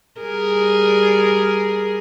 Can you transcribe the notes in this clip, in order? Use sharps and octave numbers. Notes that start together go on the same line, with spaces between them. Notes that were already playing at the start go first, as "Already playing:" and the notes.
G3 G#4 A#4